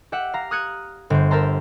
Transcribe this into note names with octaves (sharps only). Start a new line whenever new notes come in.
G4 E5 F#5
F5 A#5
D#6 F6 F#6 G#6 C#7 D#7
G1 C5
A#4 C5 E5 A5 A#5 C6